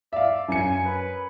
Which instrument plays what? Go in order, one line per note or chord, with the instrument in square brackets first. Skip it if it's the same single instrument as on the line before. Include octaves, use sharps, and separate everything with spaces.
[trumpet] D5 [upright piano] E5 F5
[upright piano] F#2 C#7 [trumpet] G#5
[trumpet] B4